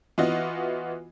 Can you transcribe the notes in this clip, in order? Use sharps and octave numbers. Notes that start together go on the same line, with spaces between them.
E3 B3 F4 F#4 D#5